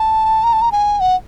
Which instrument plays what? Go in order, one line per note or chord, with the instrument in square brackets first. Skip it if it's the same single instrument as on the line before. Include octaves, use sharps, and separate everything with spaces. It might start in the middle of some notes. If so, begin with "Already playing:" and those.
Already playing: [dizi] A5
A#5
A5
A#5
G#5
F#5